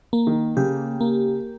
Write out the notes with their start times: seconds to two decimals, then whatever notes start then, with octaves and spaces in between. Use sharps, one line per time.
0.13 A#3
0.27 D#3
0.57 C#3 G4
1.01 A#3